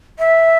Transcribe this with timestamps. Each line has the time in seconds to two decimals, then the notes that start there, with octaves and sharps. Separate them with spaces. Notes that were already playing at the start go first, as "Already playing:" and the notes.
0.18 E5